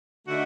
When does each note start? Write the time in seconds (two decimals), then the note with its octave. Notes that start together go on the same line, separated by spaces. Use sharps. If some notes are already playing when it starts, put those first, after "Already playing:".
0.26 D3 A3 D#4 F#4